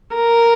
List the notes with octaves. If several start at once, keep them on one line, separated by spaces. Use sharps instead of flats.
A#4